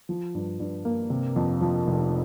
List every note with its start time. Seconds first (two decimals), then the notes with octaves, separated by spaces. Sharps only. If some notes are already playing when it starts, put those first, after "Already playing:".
0.09 F3
0.35 G2
0.60 G2
0.85 A#3
1.10 C3
1.36 F2
1.61 F3
1.87 F1